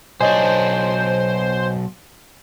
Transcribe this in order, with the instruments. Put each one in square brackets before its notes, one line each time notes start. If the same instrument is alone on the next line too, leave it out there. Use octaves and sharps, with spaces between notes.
[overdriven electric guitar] B1 D4 [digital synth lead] C5 [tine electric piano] C#5 D#5 G#5